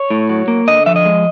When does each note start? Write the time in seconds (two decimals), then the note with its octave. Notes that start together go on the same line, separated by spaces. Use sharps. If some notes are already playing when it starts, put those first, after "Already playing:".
Already playing: C#5
0.10 A2
0.30 F#3
0.48 A#3
0.68 D3 D#5
0.86 F3 E5
0.96 D#5
1.05 G#3